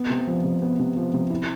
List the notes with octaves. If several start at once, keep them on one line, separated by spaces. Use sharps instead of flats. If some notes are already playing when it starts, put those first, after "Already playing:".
Already playing: B3
C3
F3
C3
B3
C3
F3
C3
E4